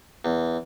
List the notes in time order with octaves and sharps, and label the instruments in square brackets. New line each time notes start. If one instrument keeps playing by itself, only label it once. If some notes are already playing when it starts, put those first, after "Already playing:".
[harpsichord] E2